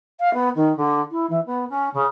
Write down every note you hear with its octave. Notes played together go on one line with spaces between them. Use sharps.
F5
B3
D#3
D3
E4
E3
B3
C#4
C#3